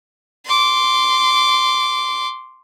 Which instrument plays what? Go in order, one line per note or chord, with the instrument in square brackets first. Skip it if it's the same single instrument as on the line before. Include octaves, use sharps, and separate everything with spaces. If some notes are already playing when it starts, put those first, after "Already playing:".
[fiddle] C6 D6